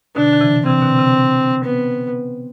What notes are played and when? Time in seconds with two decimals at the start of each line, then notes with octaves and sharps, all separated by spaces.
0.16 B2 D3 D4
0.33 D3
0.41 C3 E3
0.66 C3 E3 C4
0.82 B2 D3
0.99 C3
1.64 B3